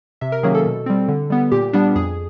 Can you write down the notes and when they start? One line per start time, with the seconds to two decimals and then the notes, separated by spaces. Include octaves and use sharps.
0.21 C3 E5
0.32 A#4
0.43 D#3 F#3 A#3 C#4 G#4
0.55 A4
0.65 B2
0.86 G3 C4
1.08 D3
1.30 G3 B3
1.52 A#2 G4
1.73 G3 B3 D4
1.95 F2 G#4